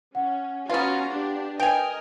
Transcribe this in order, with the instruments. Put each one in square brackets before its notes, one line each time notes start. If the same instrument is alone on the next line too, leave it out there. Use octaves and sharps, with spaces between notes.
[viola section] C#4 [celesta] F#5
[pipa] B3 F4 [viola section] C#4 F#4 A#5 [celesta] B4 A6
[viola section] D4 G4
[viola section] A#4 D#5 [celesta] B4 D7 F7 [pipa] G5 G#5